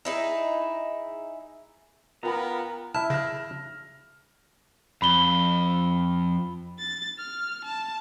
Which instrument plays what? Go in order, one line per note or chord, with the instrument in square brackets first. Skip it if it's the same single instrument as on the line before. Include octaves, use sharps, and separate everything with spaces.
[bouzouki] D#4 E4 G#4
[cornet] B3 [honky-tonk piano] F4 G5 B5 [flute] A#4 [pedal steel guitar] A#5
[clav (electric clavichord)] E4 E5 [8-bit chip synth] A5 [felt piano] F6
[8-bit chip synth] C#3 [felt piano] F6 A#6
[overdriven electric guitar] F2 [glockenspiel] B5 G7
[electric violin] A6
F6
A5